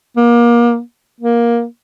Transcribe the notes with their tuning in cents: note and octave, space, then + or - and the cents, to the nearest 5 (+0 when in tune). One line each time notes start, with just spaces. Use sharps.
A#3 +30
A#3 +15